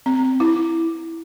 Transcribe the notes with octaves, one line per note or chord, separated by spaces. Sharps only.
C4
E4